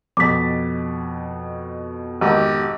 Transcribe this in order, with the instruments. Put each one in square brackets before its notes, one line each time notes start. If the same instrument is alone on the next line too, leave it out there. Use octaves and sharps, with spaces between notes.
[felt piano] F2 B2 A6 [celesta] D6 B6
[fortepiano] G#1 [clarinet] G4